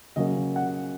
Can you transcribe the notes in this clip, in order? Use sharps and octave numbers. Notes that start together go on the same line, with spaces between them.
C#3 F#3 A#3 C#4 D#5
F#5